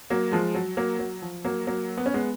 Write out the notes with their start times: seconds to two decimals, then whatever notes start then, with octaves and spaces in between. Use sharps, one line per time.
0.10 F#3 A#3
0.32 F3 G#3
0.55 F#3
0.77 F#3 A#3
0.99 F#3
1.22 F3
1.44 F#3 A#3
1.67 F#3 A#3
1.97 B3
2.06 C#4
2.14 G#3 B3